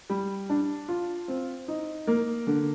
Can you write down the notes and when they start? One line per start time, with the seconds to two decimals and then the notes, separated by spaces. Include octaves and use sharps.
0.09 G3
0.50 D4
0.88 F4
1.28 C4
1.68 D#4
2.07 A#3
2.47 D3